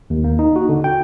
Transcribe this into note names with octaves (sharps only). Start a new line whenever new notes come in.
D#2
A#3
D#4
F#4
D3
G5